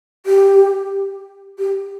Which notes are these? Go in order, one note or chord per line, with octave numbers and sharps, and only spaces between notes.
G4
G4